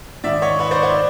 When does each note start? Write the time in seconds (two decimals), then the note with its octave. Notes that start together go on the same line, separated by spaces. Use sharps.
0.24 G#2 D#3 D5 E5
0.42 C#5 D#5
0.59 B4 C#5
0.71 C5 D5
0.83 C5 D5